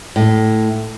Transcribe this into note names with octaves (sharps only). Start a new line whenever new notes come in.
A2